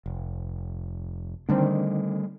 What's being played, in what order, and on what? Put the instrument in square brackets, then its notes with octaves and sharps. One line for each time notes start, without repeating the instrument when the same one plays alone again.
[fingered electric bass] F1
[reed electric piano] D3 D#3 C4 [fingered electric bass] G3 A3